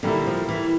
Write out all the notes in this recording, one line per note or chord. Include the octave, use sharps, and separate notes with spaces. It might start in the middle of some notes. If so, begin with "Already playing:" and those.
A#2 D3 G3 A#3 E4
F3
E3